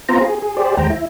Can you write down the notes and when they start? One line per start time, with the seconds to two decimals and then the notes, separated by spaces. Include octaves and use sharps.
0.09 B3 C4 F4 C5 A#5
0.21 G#4
0.42 G#4
0.56 G4 G#4 C5 D5
0.77 D#2 G#3 C5 G5 A#5
0.90 E4